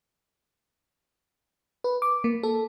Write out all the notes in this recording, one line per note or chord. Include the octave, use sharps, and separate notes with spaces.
B4
D6
A#3
A4